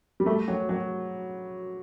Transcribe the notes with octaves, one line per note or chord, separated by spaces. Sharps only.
G3
A3
F#3
F#3